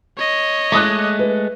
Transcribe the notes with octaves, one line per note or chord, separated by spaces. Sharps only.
C#5 D#5
G#3 A3 D6 D#6 F#6
B4